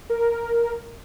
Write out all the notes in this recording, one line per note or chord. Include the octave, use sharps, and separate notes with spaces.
A#4